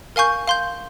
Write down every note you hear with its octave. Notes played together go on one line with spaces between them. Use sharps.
A#4 F5 G#5 C#6 G6
F5 C6 G6